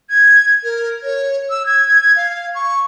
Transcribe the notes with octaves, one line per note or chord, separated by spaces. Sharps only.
G#6
A#4
C#5
E6
G#6
F5
C#6